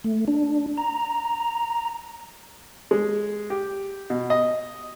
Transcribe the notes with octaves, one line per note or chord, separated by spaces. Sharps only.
A3
D4
A#5
G#3
G4
B2
D#5